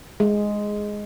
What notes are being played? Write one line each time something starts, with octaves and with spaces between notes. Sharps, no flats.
G#3